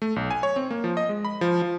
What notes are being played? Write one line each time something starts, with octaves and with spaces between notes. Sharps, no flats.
A3
B1
G#5
C#5
C4
A#3
F3
D#5
G#3
B5
F3
F3